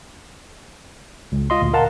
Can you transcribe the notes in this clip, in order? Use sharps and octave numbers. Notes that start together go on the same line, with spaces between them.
C#2
F4 D#5 C6
D2 A#2
A#4 F5 F#5 A5 A#5